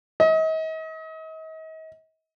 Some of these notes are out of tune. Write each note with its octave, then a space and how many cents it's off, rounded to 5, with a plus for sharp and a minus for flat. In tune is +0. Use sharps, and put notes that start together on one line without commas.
D#5 +40